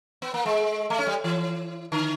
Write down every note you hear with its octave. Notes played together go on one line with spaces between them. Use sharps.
B3
A#3
G#3
A3
C#4
G3
E3
D3